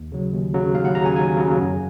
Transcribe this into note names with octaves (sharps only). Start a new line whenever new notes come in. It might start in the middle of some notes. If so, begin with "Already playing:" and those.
Already playing: D#2
C#3 F#3
D#2
C#3 F#3
D#2 F5
F#5
C#3 F#3 A#5
G#5
D#2 G#5
C#3 F#3
F#2